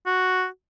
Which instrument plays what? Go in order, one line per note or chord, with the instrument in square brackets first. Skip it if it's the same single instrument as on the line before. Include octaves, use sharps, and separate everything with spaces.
[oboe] F#4